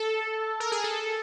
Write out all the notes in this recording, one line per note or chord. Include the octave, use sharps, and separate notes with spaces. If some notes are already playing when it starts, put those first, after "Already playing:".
Already playing: A4
A#4
G#4
A4